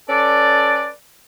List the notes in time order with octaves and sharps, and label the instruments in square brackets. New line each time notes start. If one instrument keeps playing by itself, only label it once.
[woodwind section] C#4 A4 B4 D5